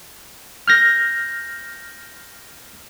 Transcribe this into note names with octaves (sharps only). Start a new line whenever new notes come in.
F6 G6 A#6